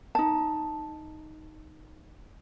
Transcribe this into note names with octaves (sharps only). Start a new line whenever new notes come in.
D#4 A5